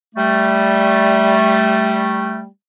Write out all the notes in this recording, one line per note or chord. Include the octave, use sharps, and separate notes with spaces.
G3 A3